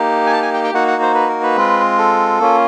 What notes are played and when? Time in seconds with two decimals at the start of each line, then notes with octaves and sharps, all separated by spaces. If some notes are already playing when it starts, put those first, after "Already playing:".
Already playing: A#3 D#4 G4
0.27 G#5
0.33 A5
0.43 G#5
0.54 G5
0.64 G5
0.74 A#3 D#4 F#4 F#5
0.88 F#5
1.02 C5
1.15 B4
1.29 A#4
1.43 B4
1.56 G#3 C4 F4
1.98 A4
2.40 A#3 C#4 F4